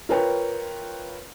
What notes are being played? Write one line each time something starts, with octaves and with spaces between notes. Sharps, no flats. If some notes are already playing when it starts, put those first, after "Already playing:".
F4 A#4 B4 C#5 G5